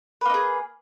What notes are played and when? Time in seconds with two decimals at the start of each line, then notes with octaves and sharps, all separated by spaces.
0.21 B4
0.25 A#3
0.30 D#4
0.34 G#4